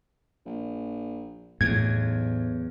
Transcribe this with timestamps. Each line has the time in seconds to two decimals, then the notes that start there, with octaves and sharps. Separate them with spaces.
0.46 A#1
1.61 B1 E2 A2 G#6